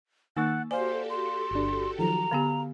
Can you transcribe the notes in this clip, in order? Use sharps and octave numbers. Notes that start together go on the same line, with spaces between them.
D#3 A#3 D#4 F#5 E6 A6
F#4 G4 A4 C5 D5 F5 G#5
C6
G1 D4
D#3 F3 F#3 A#5
D3 B3 G4 F5